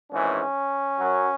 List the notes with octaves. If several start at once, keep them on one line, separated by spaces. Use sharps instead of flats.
G#1 G#2 E3 C#4
F#2 F#3